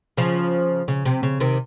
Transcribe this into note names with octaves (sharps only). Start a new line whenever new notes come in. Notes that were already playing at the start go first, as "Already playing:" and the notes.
C#3 F3
C#3
C3
C#3
C3 D#3